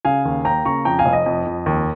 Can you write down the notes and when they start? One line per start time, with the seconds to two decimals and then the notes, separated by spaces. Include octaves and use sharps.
0.05 C#3 F5 G#5
0.25 D#2
0.45 A#3 G5 A#5
0.65 C#3 A#5 C#6
0.85 F2 G5 A#5
0.99 F5 G#5
1.05 F1
1.13 D#5
1.26 F2
1.46 F2
1.66 D#2